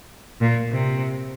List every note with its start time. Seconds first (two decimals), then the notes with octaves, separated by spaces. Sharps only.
0.41 A#2
0.72 C3